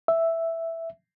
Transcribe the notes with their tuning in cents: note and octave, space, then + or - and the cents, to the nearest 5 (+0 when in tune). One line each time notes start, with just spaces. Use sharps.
E5 +0